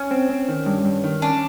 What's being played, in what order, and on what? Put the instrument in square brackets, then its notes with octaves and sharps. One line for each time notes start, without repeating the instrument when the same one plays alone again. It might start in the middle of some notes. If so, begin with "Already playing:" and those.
Already playing: [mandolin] C#4
[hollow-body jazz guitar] C4
C4
D#3
G2
G2
D#3
[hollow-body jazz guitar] C#4 [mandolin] D4